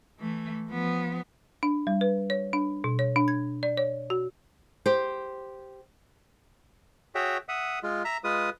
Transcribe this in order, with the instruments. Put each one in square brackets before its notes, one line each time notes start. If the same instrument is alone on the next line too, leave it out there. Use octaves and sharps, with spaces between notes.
[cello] E3 A3
F3 B3
[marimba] D4
G3
B4
C#5
D4
B2
C#5
D4
G#6
D5
C#5
F#4
[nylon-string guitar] G4 C5
[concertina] F#4 G#4 C#5 E5 G5
E5 F#5 D#6
G#3 F4
E5 A#5
G#3 F4 B4 D#6